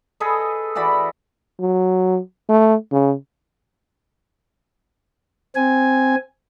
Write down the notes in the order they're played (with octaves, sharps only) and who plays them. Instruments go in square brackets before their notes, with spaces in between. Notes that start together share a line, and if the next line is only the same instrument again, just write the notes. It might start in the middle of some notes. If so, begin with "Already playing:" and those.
[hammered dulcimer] G#4 A4 B4 D#5
E3 F#4 D5 B5
[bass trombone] F#3
A3
C#3
[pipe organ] C4 G#5